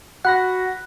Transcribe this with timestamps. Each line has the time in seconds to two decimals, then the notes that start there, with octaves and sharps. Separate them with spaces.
0.25 F#4 F#5 B5 F#6 A#6